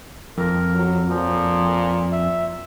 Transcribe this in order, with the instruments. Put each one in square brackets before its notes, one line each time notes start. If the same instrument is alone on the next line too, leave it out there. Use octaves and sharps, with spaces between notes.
[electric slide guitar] F2 [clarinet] A#4
[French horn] F#3
[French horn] A#2 [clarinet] F3
[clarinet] E5